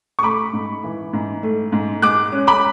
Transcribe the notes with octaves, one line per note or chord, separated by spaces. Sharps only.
C#6
A3 B5 D6
G#2
E3
G#2
A3
G#2
G#3 D6 F#6
C#4
B5 D6